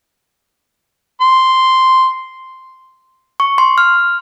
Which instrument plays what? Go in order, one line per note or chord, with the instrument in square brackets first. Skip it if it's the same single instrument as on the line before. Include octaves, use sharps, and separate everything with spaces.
[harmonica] C6
[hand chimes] C#6
C6
F6